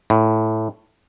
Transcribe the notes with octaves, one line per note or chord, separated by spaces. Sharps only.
A2